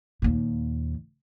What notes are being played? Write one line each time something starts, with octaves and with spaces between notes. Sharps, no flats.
D#2 A#2